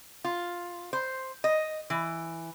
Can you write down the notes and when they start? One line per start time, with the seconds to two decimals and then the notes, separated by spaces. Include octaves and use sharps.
0.24 F4
0.93 C5
1.44 D#5
1.90 E3